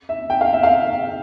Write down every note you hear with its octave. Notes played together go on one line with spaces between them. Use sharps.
E5
G5
F5
E5
F5